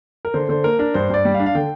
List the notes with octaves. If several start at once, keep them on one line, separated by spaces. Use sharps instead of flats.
A#4
D3 C5
D3 C5
A#3 A#4
D4 A#4
G2 C5
G2 D5
G3
F5
D4
F5
D3 G5